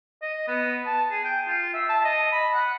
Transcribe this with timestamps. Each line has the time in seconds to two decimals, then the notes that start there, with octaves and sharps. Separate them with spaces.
0.22 D#5
0.48 B3
0.86 A5
1.11 G#4
1.24 G5
1.48 F4
1.74 E5
1.89 A5
2.04 D#5
2.32 B5
2.54 F#5